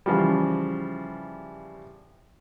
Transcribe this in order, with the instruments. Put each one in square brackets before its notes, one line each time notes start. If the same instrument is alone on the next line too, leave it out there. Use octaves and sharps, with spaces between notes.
[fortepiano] C#3 E3 F3 G3